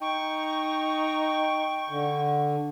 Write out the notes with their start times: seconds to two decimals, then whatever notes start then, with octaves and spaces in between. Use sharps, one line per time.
0.02 D#4 G5 C#6
1.90 D3